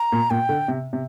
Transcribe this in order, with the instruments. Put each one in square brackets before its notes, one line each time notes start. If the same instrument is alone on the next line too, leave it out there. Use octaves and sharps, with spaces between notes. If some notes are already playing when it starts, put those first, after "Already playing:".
Already playing: [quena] A#5
[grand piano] A#2
[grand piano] A#2 [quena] G5
[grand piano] D3
C3
C3